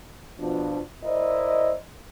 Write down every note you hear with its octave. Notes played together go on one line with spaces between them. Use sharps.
B2 F3 D4
E4 A#4 C5 D5 D#5